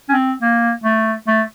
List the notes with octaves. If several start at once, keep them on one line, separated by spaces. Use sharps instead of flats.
C#4
C4
A#3
A3
A3